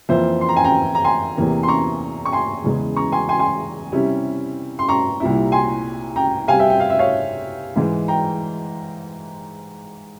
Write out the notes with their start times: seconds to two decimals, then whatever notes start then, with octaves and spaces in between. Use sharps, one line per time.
0.09 F2 E3 A#3 F4 C5 E5
0.41 C6
0.49 A#5
0.56 G#5
0.64 G5 A#5
0.95 A#5
1.04 G#5 C6
1.37 E2 C3 E3 A#3
1.63 C6
1.68 A#5 C#6
2.25 C#6
2.32 G#5 C6
2.64 E2 C#3 E3 G#3
2.96 A#5 C#6
3.12 G#5 C6
3.29 G#5 C6
3.39 G#5 C6
3.92 C3 G3 C#4 E4
4.79 C6
4.89 A#5 C#6
5.20 C2 A#2 G3 C4 E4
5.52 G#5 C6
6.16 G5 A#5
6.48 C3 G3 C4 F5 G#5
6.59 E5 G5
6.70 G5
6.80 F5
6.90 E5
6.99 C#5 F5
7.76 G#2 E3 G#3
8.08 G5 A#5